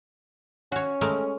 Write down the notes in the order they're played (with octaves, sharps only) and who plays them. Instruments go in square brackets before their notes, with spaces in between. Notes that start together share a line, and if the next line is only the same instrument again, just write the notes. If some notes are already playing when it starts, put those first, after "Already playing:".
[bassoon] C#4 [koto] F#4 C#5
[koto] G#3 A3 A#4